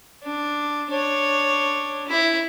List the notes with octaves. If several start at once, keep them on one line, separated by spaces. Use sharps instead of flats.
D4
D4 C#5
E4